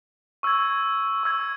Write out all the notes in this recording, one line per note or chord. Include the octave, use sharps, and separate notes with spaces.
C#6 E6 G#6
C#6 E6 G#6